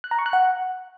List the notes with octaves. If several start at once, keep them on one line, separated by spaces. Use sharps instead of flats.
F#6
A#5
C#6
F#6
F#5